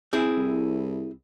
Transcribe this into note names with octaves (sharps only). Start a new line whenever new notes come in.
C4 E4 G#4
C2